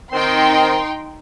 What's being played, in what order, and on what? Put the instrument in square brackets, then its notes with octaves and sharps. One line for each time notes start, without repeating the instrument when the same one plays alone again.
[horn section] D#3 C4 [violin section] D#4 G5 C6